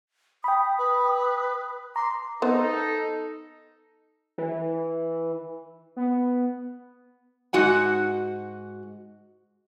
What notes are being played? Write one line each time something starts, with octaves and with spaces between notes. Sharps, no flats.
G5 B5 D#6
B4
A#5 C6 D6
B3 D#4 A4 C5
E3
B3
G#2 F#4 F#5 G#5